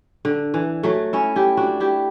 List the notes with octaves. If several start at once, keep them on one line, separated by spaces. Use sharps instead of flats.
D3
E3
F#3 A3
C#4 E4
E4 G4
D4 F#4
E4 G4